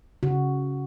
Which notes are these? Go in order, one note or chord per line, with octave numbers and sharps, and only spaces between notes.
C#3 F#4